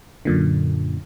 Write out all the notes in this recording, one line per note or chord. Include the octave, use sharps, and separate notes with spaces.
F#2 A#2 D3